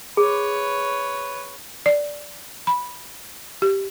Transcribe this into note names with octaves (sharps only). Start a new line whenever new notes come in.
G#4 B4 C#5
D5
B5
G4